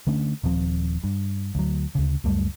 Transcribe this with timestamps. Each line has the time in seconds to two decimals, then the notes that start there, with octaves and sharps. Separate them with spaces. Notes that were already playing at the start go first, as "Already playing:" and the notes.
0.07 D3 A3 C#4 D4
0.43 D#1 D#2 F3 C4
1.04 G2
1.55 D2 F#3
1.95 D2 C#3
2.24 C#2 F#2 G3 A3